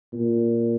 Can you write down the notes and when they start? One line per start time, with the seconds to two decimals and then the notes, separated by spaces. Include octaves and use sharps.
0.13 A#2